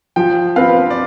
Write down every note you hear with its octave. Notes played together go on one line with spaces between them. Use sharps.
F3 G5
C4 F4 B4 F5
D5